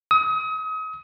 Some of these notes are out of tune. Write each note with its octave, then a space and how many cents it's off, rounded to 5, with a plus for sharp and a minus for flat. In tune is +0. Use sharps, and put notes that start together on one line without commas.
D#6 +35